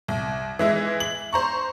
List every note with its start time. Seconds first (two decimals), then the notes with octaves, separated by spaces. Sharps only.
0.08 C2
0.59 E3 G#3 E4
1.00 F#7
1.33 C5 A#5 C#6